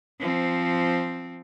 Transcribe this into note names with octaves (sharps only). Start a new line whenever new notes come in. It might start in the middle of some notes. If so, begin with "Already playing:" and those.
F3 C4